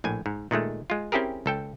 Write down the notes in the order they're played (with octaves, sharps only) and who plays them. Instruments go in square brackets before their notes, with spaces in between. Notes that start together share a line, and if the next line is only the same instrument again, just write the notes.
[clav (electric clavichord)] A#1 A2 G#5
G#2
A#2 D#3 G#3 A3
G#3 F4
C4 C#4 E4 G4 G#4 A#4
C#2 A4 G5